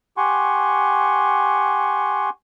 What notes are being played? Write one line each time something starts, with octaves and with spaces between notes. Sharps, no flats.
G4 F#5 G#5 C6 C#6